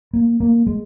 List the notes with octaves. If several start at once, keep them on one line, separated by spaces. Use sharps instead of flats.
A#3
A#3
G#3